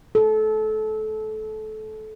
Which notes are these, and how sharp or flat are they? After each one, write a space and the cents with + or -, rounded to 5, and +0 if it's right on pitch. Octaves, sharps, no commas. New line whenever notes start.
A4 -25